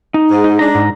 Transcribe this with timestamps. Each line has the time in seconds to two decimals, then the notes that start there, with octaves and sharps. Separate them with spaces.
0.14 D#4
0.31 G#2
0.44 D#4
0.59 G#3 D4 A#5
0.75 G#2